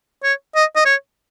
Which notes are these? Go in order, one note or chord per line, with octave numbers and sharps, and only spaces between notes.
C#5
D#5
D#5
C#5